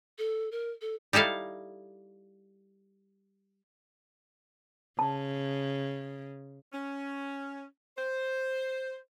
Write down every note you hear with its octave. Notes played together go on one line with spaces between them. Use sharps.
A4
A#4
A4
G3 D#4 E4 A4 F5
C#3 A5
C#4
C5